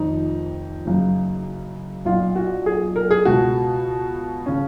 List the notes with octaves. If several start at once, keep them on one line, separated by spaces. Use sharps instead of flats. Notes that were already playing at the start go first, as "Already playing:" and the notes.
Already playing: F1 F2 D#3 D#4
F#1 F#2 C#3
B1 A#2 F4
F#4
G#4
A#4
G#4
C#2 B2 F#4
C#3 C#4